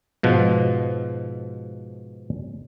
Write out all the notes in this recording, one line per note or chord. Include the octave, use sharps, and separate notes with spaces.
G#2 B2 F3